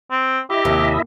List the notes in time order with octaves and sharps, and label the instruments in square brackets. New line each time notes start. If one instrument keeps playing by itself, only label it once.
[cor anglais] C4
[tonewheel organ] E4 D#5 E5 [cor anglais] G4
[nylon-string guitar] D#2 C3